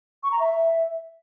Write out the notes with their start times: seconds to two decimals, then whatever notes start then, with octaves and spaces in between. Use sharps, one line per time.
0.23 C#6
0.31 A#5
0.39 E5